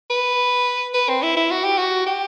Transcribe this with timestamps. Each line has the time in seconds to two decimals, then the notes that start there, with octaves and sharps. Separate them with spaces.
0.10 B4
0.94 B4
1.09 C4
1.22 E4
1.36 E4
1.51 F#4
1.64 G4
1.78 F#4
2.06 G4